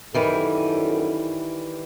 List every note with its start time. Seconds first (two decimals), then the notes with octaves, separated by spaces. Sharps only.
0.14 F#2 D#3 E3 G3 A4